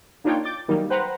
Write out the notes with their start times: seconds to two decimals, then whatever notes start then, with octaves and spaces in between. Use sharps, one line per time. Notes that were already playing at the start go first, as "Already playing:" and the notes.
0.24 A#3 D4 D#4 F4 C#5 G5
0.44 D6 G6 A6
0.68 D#3 F#3 G3 A#3 D#4
0.90 B4 C5 F#5 G5 A#5 F#6